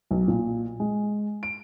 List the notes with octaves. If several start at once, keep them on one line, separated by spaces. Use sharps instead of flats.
B1
A#2
G#3
D7